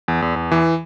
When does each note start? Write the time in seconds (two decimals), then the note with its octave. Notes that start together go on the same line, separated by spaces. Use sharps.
0.08 E2
0.22 E2
0.36 E2
0.52 E3